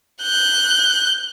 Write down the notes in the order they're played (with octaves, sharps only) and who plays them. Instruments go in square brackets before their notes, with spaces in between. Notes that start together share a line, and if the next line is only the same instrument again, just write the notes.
[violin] F#6 G6